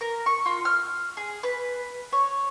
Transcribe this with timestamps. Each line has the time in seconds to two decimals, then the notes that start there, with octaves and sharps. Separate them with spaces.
0.01 A#4
0.26 C#6
0.46 F4
0.65 F6
1.17 G#4
1.43 B4
2.12 C#5